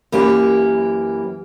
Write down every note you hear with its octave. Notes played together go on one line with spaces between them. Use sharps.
F#2 E3 A#3 G4